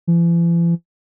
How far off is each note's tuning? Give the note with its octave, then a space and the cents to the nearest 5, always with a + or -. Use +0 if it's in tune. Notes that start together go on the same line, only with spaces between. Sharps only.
E3 +45